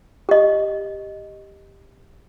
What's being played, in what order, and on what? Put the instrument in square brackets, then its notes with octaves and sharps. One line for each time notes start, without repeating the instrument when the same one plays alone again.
[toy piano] G4 D#5